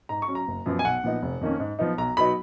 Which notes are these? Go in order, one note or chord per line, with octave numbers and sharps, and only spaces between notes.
G#2 A#5
C#6
F#3 C#4
A#5
F#1
F#2 F3 B3
G#5
B1 F#5
A#2 F3 B3 D#4
F1
F2 D#3 A#3 C#4
G#2
F3 B3 D#4
B1 A#5
B2 F#3 B3 D#4 B5